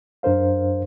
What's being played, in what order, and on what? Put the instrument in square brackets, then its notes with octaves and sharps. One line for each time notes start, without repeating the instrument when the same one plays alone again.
[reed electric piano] F#2 D4 A#4 C5 F5